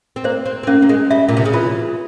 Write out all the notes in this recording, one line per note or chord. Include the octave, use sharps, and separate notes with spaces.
C4
A#3 C5
C4
C4
A#3 C#4
A#3
G#3
G3 E5
A#2
C3
C#3
E3 F4